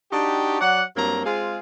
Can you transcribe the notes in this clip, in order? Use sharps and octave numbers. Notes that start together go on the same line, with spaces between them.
D4 D#4 F#4 G4
F#3 D5 F#5
G2 F#3 A#3 C4 A#5
G#3 C4 F4 G#4 F5